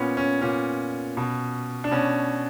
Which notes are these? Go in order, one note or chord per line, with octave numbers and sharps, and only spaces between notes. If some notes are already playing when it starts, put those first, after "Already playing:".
Already playing: A#2 B3 C#4
C#4
A#2 C#4
B2
D4
B2 C#4